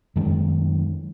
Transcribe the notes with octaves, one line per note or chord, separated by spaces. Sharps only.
F#2 D#3 G#3